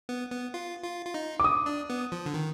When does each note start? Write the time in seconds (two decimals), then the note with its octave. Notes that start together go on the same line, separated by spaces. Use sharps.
0.09 B3
0.31 B3
0.54 F4
0.84 F4
1.06 F4
1.14 D#4
1.40 D6
1.44 D#6
1.66 D4
1.90 B3
2.12 F3
2.26 D3
2.34 D#3